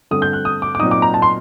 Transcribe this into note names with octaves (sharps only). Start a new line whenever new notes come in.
G2 D3 A3 C4 D#6
G6
F#6
D#6
D6
D6
A#2 F#3 C4 D#4 D#6
D6
A#5
A5
C6